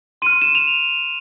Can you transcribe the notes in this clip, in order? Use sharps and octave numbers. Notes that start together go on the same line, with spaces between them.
C6 F6 D#7
E7
F7